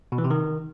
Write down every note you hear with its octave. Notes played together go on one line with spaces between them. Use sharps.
B2
E3
C3
D#3